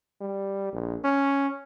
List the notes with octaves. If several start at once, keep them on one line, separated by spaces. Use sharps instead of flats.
G3
A#1
C#4